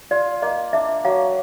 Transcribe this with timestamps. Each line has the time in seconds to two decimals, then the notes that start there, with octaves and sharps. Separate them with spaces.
0.11 F4 D5
0.42 A#3 D#5
0.73 D4 E5
1.05 F#3 F5